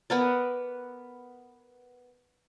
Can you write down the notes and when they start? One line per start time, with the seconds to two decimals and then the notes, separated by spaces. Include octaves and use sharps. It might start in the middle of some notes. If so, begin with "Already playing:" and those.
0.10 B3 A#4 D5